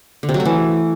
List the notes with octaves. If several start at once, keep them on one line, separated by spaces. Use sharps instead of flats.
D3
C3
F#3
A3
E3